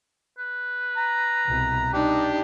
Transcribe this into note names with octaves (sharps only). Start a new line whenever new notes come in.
B4
A#5
C2 B2
D4 D#4 G4